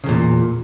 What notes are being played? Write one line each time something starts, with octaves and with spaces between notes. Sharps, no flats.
E2 A#2 C#3